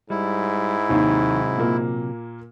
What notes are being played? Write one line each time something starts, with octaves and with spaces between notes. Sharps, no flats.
G#2 G3 E4
D#2 C3 D#3 F#3
A#2 A#3